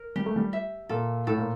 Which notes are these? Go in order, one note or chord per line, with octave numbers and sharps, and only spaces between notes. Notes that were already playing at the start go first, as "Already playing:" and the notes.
Already playing: A#4
G3 G4
A3
G3
E5
A#2 A4
A2 A4
A#2